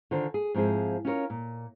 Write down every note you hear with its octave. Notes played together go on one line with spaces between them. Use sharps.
D3 D#3 F4 C5 D5 G#5
G#4
G#2 F3 C4 E4 G#4
C#4 D#4 F4 F#4 A#4 C#5
A#2